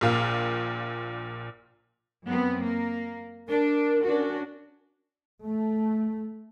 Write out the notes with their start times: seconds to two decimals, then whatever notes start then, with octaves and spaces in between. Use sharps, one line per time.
0.01 A#1 A#2 F5
2.25 F#2 B3 C4
2.61 A#3
3.48 D4 A#4
4.04 C#4 D4 F#4
5.44 A3